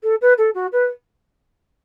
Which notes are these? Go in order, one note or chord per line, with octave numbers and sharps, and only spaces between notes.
A4
B4
A4
F#4
B4